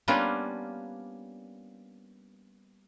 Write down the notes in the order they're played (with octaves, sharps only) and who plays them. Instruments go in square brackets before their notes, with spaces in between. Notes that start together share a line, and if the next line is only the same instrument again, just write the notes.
[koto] G3 A#3 B3 C#4 D4 F4